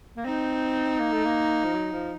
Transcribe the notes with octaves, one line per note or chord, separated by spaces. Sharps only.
A#3
C4 D#4
A#3
A3
A#3
F3
F#3
F3